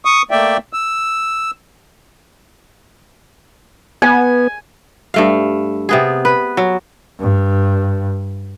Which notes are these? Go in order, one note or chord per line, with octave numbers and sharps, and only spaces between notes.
C#6 D#6
A3 A#3 D5 E5 G5
E6
B3 G#5
G2 A3 F5
C3 B3 G#4
B4
F#3
G2